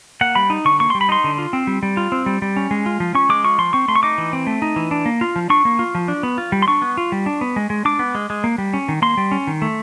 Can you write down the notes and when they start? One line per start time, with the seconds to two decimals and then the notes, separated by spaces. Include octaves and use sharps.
0.21 A#3 F#5
0.35 G3 B5
0.50 D#4
0.65 D3 C#6
0.80 A#3 C#6
0.90 G3 C6
1.01 B5
1.09 D#4 C6
1.24 D3
1.38 F4
1.53 C4
1.67 G3
1.83 G3
1.97 F4
2.12 C4
2.26 G3
2.42 G3
2.57 C#4
2.71 G#3
2.86 F4
3.00 F3
3.15 C#4 C#6
3.29 G#3 D6
3.44 F4 C#6
3.58 F3 C6
3.73 C4 C#6
3.88 A3 C6
3.96 C#6
4.03 D#4 D6
4.18 E3
4.33 C4
4.47 A3
4.62 D#4
4.76 E3
4.91 D4
5.06 A#3
5.21 F4
5.36 F3
5.50 D4 C#6
5.65 A#3
5.79 F4
5.95 F3
6.08 D4
6.23 B3
6.38 F4
6.52 G3
6.62 C6
6.68 D4 C#6
6.82 B3
6.97 F4
7.12 G3
7.26 D4
7.41 B3
7.56 G#3
7.70 G#3
7.85 D4 D6
7.99 B3
8.15 G#3
8.30 G#3
8.44 A#3
8.58 G3
8.74 C#4
8.89 D#3
9.02 A#3 C6
9.17 G3
9.32 C#4
9.47 D#3
9.62 A3